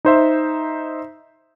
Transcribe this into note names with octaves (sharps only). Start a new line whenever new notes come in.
D#4 C5 E5